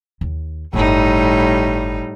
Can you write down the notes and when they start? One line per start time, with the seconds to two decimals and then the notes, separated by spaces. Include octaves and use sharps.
0.21 D#2
0.73 D1 G1 A2 G3 D#4